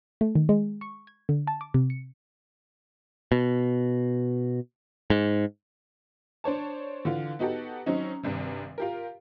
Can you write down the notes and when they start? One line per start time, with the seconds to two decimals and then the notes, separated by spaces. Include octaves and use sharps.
0.21 A3
0.35 D#3
0.49 G#3
0.81 C#6
1.07 G#6
1.29 D3
1.47 A5
1.61 D6
1.74 C3
1.90 C#7
3.32 B2
5.10 G#2
6.44 D4 C5 C#5 A5
7.05 D3 E3 F4
7.39 B3 D#4 F#4 G4 A4
7.86 F#3 C4 C#4 D#4
8.23 G#1 G2 C3
8.78 F4 G4 A#4